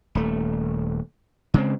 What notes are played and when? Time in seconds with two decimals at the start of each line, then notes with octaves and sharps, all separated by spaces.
0.15 D#1 A3
1.54 C#3 G#3 C4